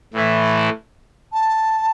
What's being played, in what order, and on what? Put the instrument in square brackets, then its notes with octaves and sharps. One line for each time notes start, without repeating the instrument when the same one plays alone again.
[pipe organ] A2 E3 A3 E4
[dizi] A5